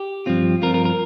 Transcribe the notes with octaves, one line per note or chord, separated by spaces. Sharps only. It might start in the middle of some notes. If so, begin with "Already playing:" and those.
Already playing: G4
G2 F3 C4 F4
G2 F3 C4 F4 A#4
A#4
A#4